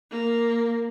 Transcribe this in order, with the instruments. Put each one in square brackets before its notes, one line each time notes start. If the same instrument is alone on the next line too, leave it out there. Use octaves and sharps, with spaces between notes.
[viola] A#3